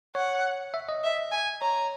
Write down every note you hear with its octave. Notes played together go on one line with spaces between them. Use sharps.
C#5 F#5
E5
D#5
E5
G#5
C#5 A#5